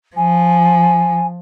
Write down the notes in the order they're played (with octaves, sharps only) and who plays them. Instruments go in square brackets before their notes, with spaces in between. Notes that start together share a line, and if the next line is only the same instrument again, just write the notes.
[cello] F3 [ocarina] G#5